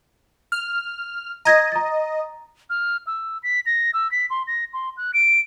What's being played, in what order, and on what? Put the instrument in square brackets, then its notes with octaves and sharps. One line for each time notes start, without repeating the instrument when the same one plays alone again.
[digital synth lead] F6
[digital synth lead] D#5 [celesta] A#5 G#6 A#6
[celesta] A#5 A6
[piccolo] F6
E6
B6
A#6
E6
B6
C6
A#6
C6
F#6
D7